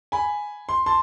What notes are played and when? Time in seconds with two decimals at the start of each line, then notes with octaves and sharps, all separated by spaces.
0.12 G#5 B5
0.69 C6
0.86 A5 C6